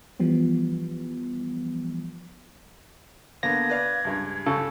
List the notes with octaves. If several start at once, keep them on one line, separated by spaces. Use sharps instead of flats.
E3 F3 G3 B3
D3 A#3 B3 G#6 A#6
B4 D5 F5
C#2 G2
C#3 A4